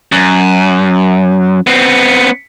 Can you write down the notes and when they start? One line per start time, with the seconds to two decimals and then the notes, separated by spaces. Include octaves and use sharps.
0.12 F#2
1.67 B3 C4